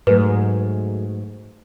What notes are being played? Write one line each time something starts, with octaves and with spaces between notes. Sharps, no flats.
G#2 F#3 A3 G#4 B4